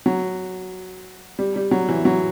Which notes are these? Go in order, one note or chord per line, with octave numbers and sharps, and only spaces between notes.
F#3
G3
G3
F#3
E3
F#3